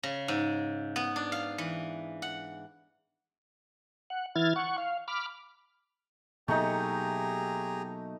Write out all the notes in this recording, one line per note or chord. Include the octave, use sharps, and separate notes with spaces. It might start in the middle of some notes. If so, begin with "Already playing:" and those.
C#3
G#2
B3
D4
F5
E3
F#5
F#5
E3 E4 F6 G#6 A6
F#5 C#6
F5
B5 D6 F6
B2 F#3 A3 A#3 D#4 G4 G#4 A#5